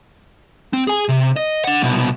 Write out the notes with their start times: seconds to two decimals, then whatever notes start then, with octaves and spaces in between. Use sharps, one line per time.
0.73 C4
0.87 G#4 G#5
1.09 C3
1.36 D#5
1.64 D4 F#5
1.83 C2 B2